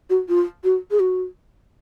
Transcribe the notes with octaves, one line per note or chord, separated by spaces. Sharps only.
F#4
F4
F#4
G#4
F#4